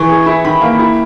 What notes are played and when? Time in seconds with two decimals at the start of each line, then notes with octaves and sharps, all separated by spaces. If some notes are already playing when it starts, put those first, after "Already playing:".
Already playing: E3 C#6
0.09 G#4
0.26 E4
0.45 D#3 B5
0.62 A#3
0.79 E4